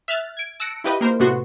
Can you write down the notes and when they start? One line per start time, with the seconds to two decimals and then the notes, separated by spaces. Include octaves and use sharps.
0.08 E5 F6 F#6 A6
0.37 G#6 D7
0.60 A5 E6 F#6 A#6 C#7 D7
0.84 E4 F4 G4 B4 D#5
1.01 A#3 A#4 C5
1.20 A2 C3 B3 F#4 C6